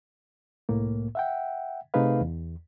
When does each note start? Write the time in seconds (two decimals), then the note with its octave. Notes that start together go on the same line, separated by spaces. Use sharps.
0.69 C2 A2 A#3
1.15 E5 F#5 G5
1.94 C3 A3 D#4 G#4 B4 F5
2.21 E2